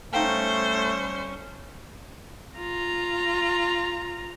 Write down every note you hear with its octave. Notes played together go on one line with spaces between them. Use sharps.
G3 A3 C#4 D#4 C5 F5 G5
F4 A#5